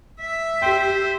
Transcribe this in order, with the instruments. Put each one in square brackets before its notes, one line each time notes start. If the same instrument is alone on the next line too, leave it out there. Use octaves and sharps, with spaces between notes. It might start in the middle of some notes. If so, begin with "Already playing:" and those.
[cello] E5
[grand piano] G4 G5 [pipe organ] C5